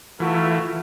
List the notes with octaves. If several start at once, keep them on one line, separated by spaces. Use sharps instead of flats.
E3 A3 F4 F#4 A#4